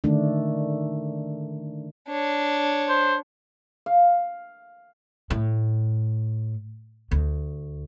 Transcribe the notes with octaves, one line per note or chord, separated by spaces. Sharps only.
D3 D#3 A3 D4
D4 C#5
C5
F5
A2
D2